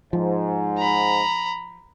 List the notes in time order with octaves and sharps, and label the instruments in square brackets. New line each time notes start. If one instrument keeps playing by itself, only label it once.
[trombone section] G#2 [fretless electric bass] F3
[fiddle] A#5 B5